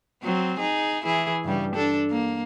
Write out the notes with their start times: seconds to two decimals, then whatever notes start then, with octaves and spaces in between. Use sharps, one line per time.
0.23 F#3 C4
0.59 D#4 G#4
1.04 E3 E4 G#4
1.44 G2 C#3 G3
1.75 D4 A4
2.11 A#3